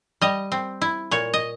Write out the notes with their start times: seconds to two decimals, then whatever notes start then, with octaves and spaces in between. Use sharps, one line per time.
0.21 G3 D#5
0.52 C4
0.81 E4
1.11 A#2 C#5
1.34 D#5